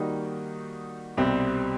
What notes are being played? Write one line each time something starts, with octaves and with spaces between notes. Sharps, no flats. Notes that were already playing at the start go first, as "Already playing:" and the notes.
Already playing: D#3 G3 A#3 D#4 F#4
C2 B2 G3 C4